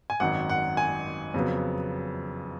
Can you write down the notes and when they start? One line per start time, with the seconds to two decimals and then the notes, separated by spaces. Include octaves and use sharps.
0.10 G#5
0.20 G#1 F#2 D#3 F#5
0.49 F#5
0.77 G#5
1.34 F2 C#3 F#3 B3